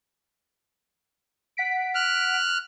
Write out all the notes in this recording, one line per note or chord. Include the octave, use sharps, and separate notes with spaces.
F#5 B6 D7
F6 F#6